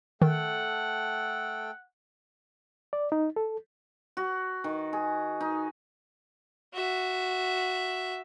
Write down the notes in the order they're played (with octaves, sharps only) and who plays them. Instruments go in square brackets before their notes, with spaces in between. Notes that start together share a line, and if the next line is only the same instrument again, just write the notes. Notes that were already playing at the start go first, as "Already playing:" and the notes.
[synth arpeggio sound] D#3 [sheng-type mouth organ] A3 A4 G5 [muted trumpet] F#5
[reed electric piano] D5
D#4
A4
[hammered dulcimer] F#4
D#3
G#4
D#4
[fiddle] F#4 E5